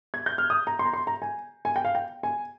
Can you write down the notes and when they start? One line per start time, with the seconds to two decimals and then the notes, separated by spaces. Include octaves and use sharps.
0.14 G#6
0.26 G6
0.38 F6
0.50 D#6
0.67 A#5
0.79 C6
0.86 A#5
0.93 C6
1.07 A#5
1.22 G#5
1.65 G#5
1.76 G5
1.85 F5
1.95 G5
2.23 G#5